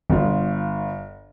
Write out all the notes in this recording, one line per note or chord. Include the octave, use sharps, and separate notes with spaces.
G1 F4